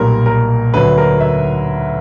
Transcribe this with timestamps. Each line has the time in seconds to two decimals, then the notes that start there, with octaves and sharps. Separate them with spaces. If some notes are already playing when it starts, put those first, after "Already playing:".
Already playing: B1 A#2 G3 A#4
0.26 A#4
0.74 D2 D3 F#3 B4
0.98 A#4
1.21 E5